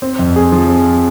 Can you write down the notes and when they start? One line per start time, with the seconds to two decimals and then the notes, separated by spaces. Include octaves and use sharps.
0.02 C4
0.19 F2
0.36 G#4
0.52 F3
0.69 C4